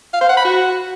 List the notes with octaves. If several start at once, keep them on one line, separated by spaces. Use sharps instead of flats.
F5
C5
F#5
B5
F#4